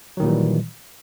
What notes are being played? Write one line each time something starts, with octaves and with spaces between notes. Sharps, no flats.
A#2 D#3 E3 F#3 G3